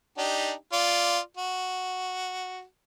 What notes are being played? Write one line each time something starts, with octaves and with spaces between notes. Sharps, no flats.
D4 D#4 G4
F4 D5
F#4